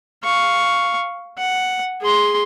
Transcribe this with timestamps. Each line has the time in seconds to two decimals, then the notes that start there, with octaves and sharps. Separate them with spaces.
0.24 F5 C#6
1.38 F#5
2.01 G#4 C6